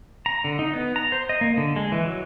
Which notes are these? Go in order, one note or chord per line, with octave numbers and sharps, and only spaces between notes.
A#5
D3
D#4
B3
A#5
C5
D#5
A#3
D3
G#3
E3
F#3